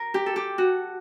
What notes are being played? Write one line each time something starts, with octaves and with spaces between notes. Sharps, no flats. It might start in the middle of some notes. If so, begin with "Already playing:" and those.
Already playing: A#4
G4
A4
G4
F#4